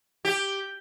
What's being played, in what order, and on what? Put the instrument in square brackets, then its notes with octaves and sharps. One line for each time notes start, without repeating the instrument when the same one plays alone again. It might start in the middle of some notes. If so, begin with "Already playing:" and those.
[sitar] G4